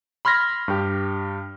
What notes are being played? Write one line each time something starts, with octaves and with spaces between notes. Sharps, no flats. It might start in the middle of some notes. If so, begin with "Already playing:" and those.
B5 C6 F6 G#6 A#6 B6
G2 G4